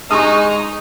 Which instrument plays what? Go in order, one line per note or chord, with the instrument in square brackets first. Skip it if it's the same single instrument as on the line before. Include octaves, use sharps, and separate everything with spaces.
[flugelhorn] G#3 [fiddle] D#4 [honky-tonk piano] C#6 D#6